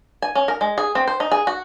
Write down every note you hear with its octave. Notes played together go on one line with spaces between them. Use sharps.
G#5
C#4
A#4
G#3
G#4
C4
C5
D#4
G#4
F#4